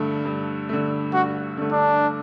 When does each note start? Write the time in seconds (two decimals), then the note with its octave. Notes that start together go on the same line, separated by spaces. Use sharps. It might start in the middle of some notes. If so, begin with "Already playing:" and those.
Already playing: G2 D3 A3
0.25 G2
0.69 D3 A3
1.13 G2 F#4
1.57 D3 A3
1.72 D4